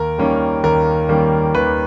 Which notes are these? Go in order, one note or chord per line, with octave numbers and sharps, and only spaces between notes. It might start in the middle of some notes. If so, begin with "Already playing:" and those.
Already playing: D#2 A#4
D#3 G3 A#3 C#4
D#2 A#4
D#3 G3 A#3 C#4
D#2 B4